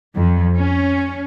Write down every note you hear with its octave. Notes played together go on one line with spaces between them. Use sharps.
F2
C#4